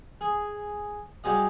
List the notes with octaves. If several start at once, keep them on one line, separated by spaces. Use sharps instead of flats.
G#4
F#3 G3 G#4 D#5